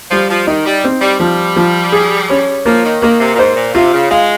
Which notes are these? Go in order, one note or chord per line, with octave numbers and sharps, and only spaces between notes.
F3 G3
F3
D#3 D#4
G3
C4
G3
F3 G3
F3
G#4
C#4
F3 A#3
D#3
D#3 A#3
C3
A#2
G#2 C5
A#2
C3 F4
C#3
G#3 F5